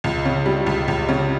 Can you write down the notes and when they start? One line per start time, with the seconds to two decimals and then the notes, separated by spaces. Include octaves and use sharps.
0.04 C#2
0.25 C#3
0.46 G3
0.66 C#2
0.88 C#2
1.09 C#3